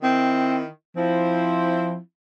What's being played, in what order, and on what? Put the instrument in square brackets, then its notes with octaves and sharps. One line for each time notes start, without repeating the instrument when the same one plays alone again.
[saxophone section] D#3 E4 [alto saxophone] C4
[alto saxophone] F3 [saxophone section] C4 E4